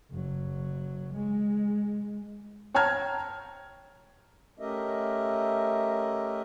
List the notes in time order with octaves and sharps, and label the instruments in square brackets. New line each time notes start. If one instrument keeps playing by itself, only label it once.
[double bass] F#1 F#3
G#3
[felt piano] C#5 G5 A5 A#5 F6 G#6
[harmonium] A3 C#4 G4 A#4 D#5 E5